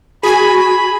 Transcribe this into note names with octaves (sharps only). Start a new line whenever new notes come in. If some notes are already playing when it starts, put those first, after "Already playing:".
F#4 G#4 G#5 B5